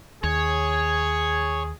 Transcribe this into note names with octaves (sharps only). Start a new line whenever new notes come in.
D#2 G#4 C#5